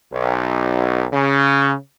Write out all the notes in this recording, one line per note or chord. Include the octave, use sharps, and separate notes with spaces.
B1
C#3